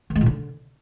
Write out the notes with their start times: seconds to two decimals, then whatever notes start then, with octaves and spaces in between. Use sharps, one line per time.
0.10 D#3
0.15 G#3
0.21 A#2
0.26 D3